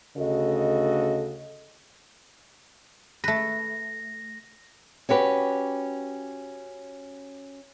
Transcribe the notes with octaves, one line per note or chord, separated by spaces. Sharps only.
D2 C#3 F#4 A4 D#5
A3 B4 A#6
C#4 F#4 G4 B4